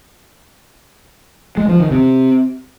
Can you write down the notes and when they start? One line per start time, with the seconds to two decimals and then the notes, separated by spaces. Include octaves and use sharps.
1.57 G#3
1.69 F3
1.80 D#3
1.91 C3